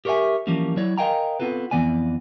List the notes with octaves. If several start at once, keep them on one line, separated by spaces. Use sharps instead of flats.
G4 A#4 C#5 D5 E5 G#5
E3 F3 G3 A#3 C#4
F#3 E4 C#5 D5
A#4 D#5 F5 G5 G#5 A#5
B3 C4 F4 A4 B4
F2 G#2 E3 B3 D5 G#5